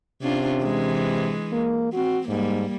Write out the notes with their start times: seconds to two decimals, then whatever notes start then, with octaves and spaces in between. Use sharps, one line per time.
0.22 C3 C#4 D4 F4
0.63 E3 G#3
1.52 A#3
1.93 C4 F#4
2.28 G#2 G3 A#3